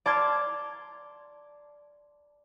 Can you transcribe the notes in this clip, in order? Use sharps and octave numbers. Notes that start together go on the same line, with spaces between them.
D5 A5 A#5 C6 F6 G#6